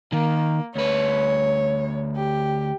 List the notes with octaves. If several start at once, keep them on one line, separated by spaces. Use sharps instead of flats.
D#3 A#3
D2 B4 C#5
G4